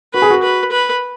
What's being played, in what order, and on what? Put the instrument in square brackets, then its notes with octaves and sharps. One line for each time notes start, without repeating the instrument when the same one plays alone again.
[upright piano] F#4 [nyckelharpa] B4
[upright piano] G#4
F#4
[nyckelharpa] B4
B4